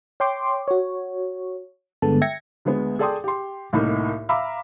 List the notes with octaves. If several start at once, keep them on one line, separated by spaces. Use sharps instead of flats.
C#5 G5 C6 D6
F#4 C#5
G2 D3 G#3 B3 A4 A5
E5 G5 G#6 A#6 C#7
D2 G#3 B3
G#4 A4 D5 G5 C6 D#6
G4 C6
C2 A2 A#3 D#4 E4
E5 F5 A#5 B5 D6 E6